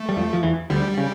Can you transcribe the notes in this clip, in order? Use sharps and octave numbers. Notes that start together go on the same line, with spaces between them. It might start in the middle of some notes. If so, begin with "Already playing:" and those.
Already playing: A3
G3
F2 F3
F3
E2 E3
D2 D3 G3
C#3